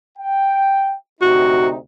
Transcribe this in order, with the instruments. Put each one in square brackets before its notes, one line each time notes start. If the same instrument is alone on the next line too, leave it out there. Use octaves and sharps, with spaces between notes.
[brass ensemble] G5
[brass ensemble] D2 C3 D#4 [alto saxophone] F#4